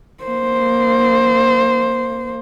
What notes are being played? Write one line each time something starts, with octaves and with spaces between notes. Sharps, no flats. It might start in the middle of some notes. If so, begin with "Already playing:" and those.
A#3 C5